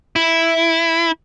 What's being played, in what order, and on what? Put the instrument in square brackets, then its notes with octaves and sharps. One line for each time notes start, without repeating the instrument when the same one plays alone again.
[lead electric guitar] E4